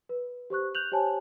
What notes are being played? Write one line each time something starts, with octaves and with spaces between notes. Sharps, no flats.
B4
G4 C5 C#6 F#6
F#6 G6 F7 F#7
G4 C5 C#5 G#5 A5